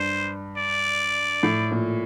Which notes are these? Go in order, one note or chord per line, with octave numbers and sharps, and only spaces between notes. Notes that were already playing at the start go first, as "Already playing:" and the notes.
Already playing: G2 C5
D5
A2
A#2